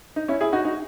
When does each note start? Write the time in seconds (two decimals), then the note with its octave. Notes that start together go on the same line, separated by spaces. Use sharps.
0.16 D#4
0.28 C#4 E4
0.41 E4 G#4
0.53 D#4 F#4
0.65 D#4 F#4